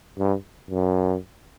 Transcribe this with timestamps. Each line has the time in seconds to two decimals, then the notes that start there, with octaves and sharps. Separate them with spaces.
0.18 G2
0.71 F#2